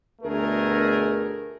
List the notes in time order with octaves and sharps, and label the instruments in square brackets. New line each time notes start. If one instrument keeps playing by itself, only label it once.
[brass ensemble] D2 B2 A3 G#4 A#4